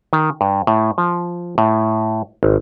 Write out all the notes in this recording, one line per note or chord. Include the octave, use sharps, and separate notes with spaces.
D#3
G2
A2
F3
A2
G#1